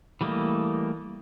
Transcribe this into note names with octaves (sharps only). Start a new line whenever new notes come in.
E3 G3 A3 A#3 D#5